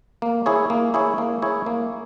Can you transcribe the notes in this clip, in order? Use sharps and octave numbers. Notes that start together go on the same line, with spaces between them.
A#3
E4 G#4 C#5
A#3
E4 G#4 C#5
A#3
E4 G#4 C#5
A#3